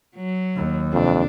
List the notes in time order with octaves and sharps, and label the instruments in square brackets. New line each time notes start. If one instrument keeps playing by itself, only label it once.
[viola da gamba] F#3
[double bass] D#2
[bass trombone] F2 [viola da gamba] C3 D4